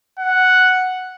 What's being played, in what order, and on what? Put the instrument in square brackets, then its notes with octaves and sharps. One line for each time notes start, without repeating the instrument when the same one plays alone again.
[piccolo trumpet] F#5